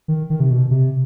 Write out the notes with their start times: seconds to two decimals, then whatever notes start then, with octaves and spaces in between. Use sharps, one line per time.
0.08 D#3
0.30 D#3
0.40 C3
0.51 B2
0.71 C3